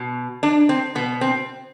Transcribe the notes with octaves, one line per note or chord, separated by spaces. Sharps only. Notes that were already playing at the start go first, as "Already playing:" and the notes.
Already playing: B2
D4
C4
B2 B3
C4